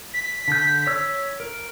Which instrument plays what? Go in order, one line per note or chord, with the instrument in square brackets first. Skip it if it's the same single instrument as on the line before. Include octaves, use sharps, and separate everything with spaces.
[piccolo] B6
[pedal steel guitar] D3 G6
C#5 E6
A#4